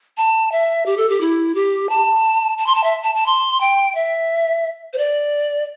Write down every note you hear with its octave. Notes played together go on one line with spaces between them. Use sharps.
A5
E5
G4
A4
G4
E4
G4
A5
A5
C6
A5
E5
A5
A5
C6
G5
E5
C5
D5